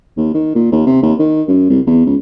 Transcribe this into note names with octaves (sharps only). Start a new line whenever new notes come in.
D#2
D#3
A#2
D#2
C3
D#2
D#3
F#2
C2
E2
C#2